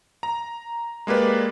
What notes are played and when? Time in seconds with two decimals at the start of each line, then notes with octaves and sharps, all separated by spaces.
0.23 A#5
1.07 G#3 A#3 G4 B4 D5